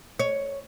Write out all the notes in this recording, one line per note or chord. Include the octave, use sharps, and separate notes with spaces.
C#5